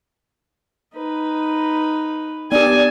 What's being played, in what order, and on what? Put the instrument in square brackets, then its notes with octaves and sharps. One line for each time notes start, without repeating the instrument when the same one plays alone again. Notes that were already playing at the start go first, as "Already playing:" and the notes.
[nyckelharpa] D#4 B4
[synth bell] B3 G4 [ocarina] D5 [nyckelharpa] G#5 A5